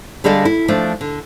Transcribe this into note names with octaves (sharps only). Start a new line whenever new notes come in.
D3 G3 G#4 A4 D#5 F5
E4
F3 A3 D4
D3